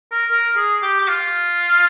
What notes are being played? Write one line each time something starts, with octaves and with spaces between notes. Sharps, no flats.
A#4
A#4
G#4
G4
G4
F4